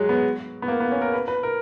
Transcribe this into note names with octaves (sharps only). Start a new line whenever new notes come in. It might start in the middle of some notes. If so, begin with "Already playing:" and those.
Already playing: F#3 G#3
B3
B3
A#3
B3
C#4
A#4
B4
B4
A#4